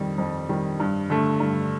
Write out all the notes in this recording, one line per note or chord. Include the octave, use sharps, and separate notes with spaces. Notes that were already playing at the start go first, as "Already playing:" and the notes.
Already playing: F2 D#3 G3
F2
D#3 G3
G2
D3 A3
G2